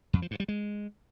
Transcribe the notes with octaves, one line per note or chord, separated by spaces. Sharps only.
F2
F3
G2
G3
G#3